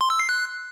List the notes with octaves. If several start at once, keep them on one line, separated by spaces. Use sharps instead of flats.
C6
E6
C7
F#6